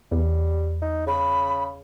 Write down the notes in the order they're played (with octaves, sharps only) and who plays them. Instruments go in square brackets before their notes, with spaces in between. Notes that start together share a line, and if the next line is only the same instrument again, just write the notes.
[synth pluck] E2 [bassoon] G3
[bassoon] D#4
[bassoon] C#3 [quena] B5